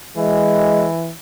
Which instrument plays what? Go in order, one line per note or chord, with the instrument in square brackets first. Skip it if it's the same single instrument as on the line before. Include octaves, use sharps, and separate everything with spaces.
[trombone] E3 [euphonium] G#3